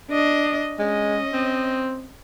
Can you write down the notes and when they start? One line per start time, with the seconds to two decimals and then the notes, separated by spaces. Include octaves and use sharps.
0.10 D4 D#5
0.79 G#3 C#4 D#5
1.33 C4